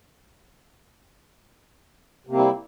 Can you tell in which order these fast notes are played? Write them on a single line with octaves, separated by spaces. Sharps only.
C3 A#3 C4 G3 E4